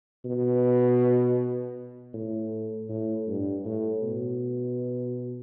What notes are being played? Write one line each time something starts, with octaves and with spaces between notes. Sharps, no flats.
B2
A2
A2
G2
A2
B2